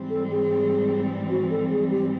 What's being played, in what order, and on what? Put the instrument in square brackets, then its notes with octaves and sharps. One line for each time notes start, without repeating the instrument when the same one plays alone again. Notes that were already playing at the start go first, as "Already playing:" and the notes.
Already playing: [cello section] G#2 E3 G3 C4
[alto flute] A4
G#4
F#4
A4
G#4
G4